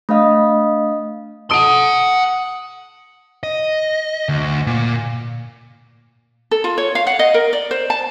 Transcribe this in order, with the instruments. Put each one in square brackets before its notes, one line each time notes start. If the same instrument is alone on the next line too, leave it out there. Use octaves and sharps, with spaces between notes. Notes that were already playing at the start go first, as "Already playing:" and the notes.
[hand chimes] A3 D4 D#5 F5 D#6
[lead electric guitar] F#5 C6 [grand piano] A5 D#6 D7
[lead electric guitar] D#5
D2
A#2
[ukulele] A4
F4
C#5
F5
F#5
D#5
A#4
D5
C5
A5